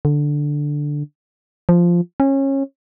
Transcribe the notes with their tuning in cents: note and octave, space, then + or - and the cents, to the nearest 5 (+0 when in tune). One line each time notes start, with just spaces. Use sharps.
D3 +0
F3 -5
C#4 -25